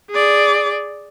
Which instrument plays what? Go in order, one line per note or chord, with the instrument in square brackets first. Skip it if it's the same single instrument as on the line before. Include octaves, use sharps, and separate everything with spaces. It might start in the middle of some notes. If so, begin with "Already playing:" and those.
[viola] G#4 D5